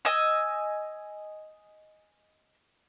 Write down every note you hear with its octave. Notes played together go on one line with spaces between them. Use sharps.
D#5 G#5 E6